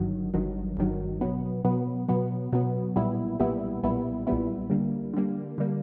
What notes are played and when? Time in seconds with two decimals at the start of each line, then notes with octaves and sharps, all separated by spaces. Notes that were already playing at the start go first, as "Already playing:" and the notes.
Already playing: G1 G2 D#3 F#3
0.34 G1 G2 D#3 F#3
0.77 G1 G2 D#3 F#3
1.21 B2 F#3 B3
1.65 B2 F#3 B3
2.09 B2 F#3 B3
2.53 B2 F#3 B3
2.96 B1 A#2 G3 B3 E4
3.40 B1 A#2 G3 B3 E4
3.83 B1 A#2 G3 B3 E4
4.27 B1 A#2 G3 B3 E4
4.70 D3 G3 A#3
5.14 D3 G3 A#3
5.58 D3 G3 A#3